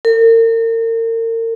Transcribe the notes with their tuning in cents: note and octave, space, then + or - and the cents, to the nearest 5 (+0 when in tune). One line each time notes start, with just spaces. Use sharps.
A#4 -40